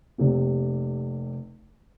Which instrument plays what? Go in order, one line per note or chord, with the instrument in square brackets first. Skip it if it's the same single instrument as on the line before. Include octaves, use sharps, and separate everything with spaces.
[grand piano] F1 C3 A#3